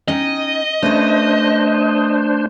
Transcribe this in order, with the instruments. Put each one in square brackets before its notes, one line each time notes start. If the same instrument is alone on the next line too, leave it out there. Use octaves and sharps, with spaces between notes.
[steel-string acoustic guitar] C#4 D#4 G5 [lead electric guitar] D#5
[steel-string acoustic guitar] A3 C#4 B4 [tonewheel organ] D4 C5